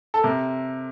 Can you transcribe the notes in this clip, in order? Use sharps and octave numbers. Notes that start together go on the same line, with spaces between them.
A4
C3 A#4